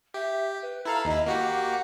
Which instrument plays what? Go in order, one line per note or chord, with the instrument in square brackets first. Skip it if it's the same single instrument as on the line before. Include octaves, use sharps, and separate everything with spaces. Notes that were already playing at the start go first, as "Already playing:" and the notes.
[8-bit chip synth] G4 [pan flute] E5
[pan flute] B4
[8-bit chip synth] E4 A4 F5 [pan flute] A#5
[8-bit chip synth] D#2 E4 [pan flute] D#5
[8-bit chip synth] A#3 F#4 G4 [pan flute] F#5